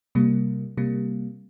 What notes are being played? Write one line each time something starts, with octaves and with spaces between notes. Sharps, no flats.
C3 G3 A#3
C3 G3 A#3